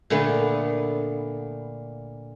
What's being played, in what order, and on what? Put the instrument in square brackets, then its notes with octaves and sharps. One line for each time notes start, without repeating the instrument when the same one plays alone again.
[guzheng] A#2 D3 A3 B3